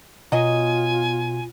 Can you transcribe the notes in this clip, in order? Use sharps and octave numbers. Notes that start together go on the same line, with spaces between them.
B2 F#3 F4 D#5 G#5